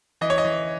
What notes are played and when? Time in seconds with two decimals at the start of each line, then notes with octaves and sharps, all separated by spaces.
0.21 E3 D#5
0.30 C#5
0.38 D#5
0.45 E3